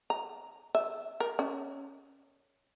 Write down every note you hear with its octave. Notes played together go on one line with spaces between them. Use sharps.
A#5
E5
A#4
C#4